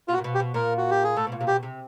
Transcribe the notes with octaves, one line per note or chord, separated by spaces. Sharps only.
B2 F4
F#4
A#2
B2
G4
B2
A#2 A#4
F#4
G4
G#4
A2 A4
B2
A#2
C3
B2 G4
C3